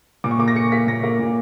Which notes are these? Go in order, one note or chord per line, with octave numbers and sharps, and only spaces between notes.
A#2 D6
C#6
A#3 D6
A#6
A#3 C#7
A#3 B6
A#2 A#6
A#3
A#2